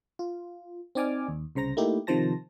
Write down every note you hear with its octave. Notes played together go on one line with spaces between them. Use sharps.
F4
C4 D#4 D5 G#5 D6 F6
D#2
C2 C#3 C5 A#5 A#6
A3 A#3 D#4 E4 G4
C3 D#3 F3 C5 A5 A#6